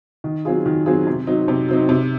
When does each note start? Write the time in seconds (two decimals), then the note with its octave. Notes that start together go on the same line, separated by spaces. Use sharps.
0.24 D#3
0.45 F#3 C4 F4 G#4
0.66 D#3
0.86 F#3 C4 F4 G#4
1.07 C3
1.27 F#3 C4 D#4
1.48 C3
1.69 F#3 C4 D#4
1.89 C3